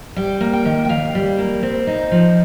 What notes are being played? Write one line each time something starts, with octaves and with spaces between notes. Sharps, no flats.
G3 G5
A#3
G5
D#3
G5
D#2 F5
G3
A#3
C4
D#4
F3